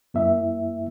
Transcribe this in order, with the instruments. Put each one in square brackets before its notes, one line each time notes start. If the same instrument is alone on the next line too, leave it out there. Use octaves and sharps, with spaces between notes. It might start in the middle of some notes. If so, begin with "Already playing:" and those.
[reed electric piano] F#2 A#3 E4 E5